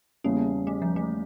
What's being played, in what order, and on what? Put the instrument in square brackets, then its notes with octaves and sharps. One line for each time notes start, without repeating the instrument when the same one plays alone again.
[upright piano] E2 C#3 G3 C#4 [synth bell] A#3
[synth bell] A3
F3
A3